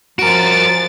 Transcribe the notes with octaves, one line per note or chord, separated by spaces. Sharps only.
F3 F#4 A#4 A6 D7